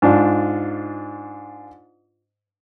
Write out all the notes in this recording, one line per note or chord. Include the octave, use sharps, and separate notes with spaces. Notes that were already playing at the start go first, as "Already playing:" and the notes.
G#2 D4 F4